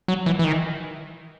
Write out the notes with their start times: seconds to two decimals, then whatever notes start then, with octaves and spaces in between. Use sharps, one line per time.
0.08 F#3
0.26 E3
0.39 E3
0.44 D#3